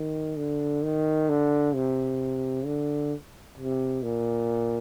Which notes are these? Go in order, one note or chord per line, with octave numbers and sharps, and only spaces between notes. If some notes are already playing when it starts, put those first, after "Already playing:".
Already playing: D#3
D3
D#3
D3
C3
D3
C3
A#2